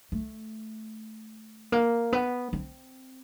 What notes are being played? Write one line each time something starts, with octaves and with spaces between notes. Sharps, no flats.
A3
A#3
B3
C4